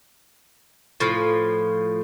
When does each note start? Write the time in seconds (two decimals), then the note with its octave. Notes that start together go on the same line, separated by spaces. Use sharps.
1.00 A2 F3